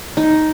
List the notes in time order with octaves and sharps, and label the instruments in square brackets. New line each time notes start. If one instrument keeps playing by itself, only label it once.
[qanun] D#4